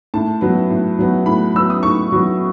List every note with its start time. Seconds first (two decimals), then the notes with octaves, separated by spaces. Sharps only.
0.14 A2 A5
0.41 F#3 B3
0.70 A2
0.99 F#3 B3
1.26 A2 B5
1.55 F#3 B3 E6
1.70 D#6
1.83 A2 C#6
2.12 F#3 B3